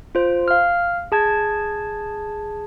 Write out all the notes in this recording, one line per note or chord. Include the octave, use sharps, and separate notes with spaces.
F4 C5
F5 F6
G#4 A5 G#6